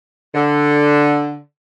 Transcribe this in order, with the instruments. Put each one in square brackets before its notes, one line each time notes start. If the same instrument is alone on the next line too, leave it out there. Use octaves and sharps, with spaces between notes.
[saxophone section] D3